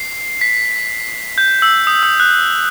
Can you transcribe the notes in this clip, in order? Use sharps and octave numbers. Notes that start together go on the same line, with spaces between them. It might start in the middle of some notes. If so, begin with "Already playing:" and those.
Already playing: C7
B6
G6
E6
D#6
E6
F#6